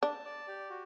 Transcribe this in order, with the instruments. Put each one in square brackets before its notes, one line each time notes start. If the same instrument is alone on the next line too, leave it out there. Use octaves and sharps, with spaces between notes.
[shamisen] D4 [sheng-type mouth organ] A5
[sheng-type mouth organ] D5
G4
F#4